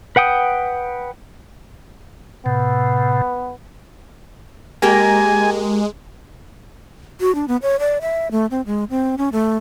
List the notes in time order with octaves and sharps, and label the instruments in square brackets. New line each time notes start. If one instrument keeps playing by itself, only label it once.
[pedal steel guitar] B4 F#5 G5 D#6
[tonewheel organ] A2 C3 [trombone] B3
[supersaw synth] G#3 [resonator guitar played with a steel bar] A#3 G4 A#4 [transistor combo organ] G#5
[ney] F#4
D4
B3
C#5
D5
E5
A3
C4
G#3
C4
C#4
A3